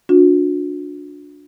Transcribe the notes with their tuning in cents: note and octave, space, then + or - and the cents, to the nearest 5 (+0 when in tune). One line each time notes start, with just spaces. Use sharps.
D4 -10 F#4 -45